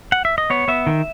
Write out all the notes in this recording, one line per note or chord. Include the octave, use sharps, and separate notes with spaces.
F#5
E5
D#5
B3 C#5
B3 E5
D#3